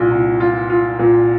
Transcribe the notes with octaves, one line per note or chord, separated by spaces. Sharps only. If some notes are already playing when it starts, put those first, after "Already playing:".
Already playing: C2 A#2
C2
F4
F4
A#2